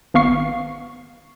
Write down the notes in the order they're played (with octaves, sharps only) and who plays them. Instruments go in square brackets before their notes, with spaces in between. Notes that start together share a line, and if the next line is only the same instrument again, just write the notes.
[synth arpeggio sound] G#1 B3 F5 C#6 C7